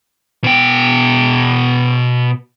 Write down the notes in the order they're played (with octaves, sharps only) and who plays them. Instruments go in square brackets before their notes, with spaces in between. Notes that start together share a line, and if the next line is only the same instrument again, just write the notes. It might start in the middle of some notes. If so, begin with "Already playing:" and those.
[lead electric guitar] B2 G5